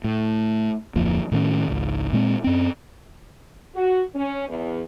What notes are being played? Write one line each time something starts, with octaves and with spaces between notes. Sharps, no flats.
A2
D1 F2 F3 A#3
A2 D#3 C#4
G#1 C#2
A#2 G#3 C4
F#2 C4
F#4
C#4
E2